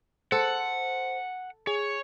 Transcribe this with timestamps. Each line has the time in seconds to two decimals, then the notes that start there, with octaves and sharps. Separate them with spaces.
0.32 A4 C5 F#5
1.67 G#4 C#5